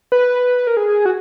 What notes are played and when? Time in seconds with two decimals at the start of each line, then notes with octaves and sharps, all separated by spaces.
0.12 B4
0.67 A#4
0.77 G#4
1.06 F#4